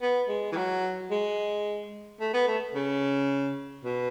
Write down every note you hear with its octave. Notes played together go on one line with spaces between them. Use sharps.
B3
G#3
E3
F#3
G#3
A3
B3
A3
C#3
B2